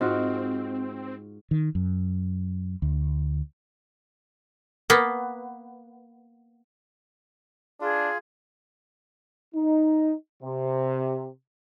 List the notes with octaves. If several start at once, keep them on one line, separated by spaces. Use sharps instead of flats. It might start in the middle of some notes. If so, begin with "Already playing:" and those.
G#2 C4 F4 F#4
D#3
F#2
D2
A#3 B3
D4 F4 G#4
D#4
C3